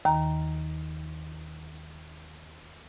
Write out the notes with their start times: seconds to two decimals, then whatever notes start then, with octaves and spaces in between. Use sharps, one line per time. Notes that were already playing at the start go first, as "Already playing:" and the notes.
0.05 D#2 D#3 A#5